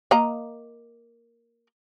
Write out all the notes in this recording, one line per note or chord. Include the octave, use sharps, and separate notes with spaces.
A#3 D#5 A#5